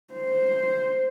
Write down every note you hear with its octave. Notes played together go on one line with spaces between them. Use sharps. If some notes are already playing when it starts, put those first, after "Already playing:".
C5